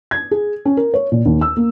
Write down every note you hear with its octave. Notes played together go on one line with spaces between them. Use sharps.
G#6
G#4
C#4
A#4
C#5
A#2
D#2
E6
A#3